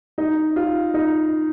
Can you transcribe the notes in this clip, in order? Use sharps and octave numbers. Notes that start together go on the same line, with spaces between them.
D#4
F4
D#4